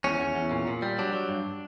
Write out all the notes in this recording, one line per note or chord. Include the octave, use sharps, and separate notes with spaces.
E2 C#4
E2
E2
A#2
A#2
G3
F#3 D4
F#3
G2